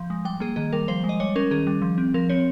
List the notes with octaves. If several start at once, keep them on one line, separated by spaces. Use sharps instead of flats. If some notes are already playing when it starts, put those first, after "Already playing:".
Already playing: F3
G#3
G3 G5
A#3 G#4
D#3 G#4
G3 A#4
F3 C5
G#3
D#5
G3 C#5
C#4 A#4
D#3 G#4
G3
F3
C4
F3 A#4
C4 C#5